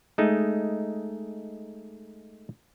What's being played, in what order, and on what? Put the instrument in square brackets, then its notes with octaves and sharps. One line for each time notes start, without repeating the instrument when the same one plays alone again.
[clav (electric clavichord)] G#3 A3 D#4